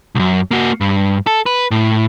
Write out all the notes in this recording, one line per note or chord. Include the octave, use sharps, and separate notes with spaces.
C2 F#2
A#3 F#4
G2
A4
B4
A2